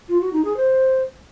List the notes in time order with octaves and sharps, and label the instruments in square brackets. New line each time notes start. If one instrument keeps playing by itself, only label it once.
[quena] F4
F#4
D#4
G#4
C5